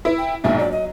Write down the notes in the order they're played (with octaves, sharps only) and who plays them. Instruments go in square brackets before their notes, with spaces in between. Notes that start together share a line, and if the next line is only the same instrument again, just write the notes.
[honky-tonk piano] E4 [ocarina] B4
[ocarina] G5
[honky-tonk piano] A#1 G#2 B2 [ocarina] E5
[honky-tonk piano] F#3 [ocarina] D5
[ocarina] D#5